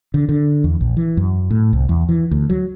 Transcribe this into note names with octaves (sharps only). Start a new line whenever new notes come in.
D3
D3
E2
A#1
E3
F#2
A2
C2
E2
E3
D2
F#3